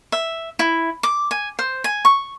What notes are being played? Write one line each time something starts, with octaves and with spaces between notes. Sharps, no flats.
E5
E4
D6
G#5
C5
G#5
C#6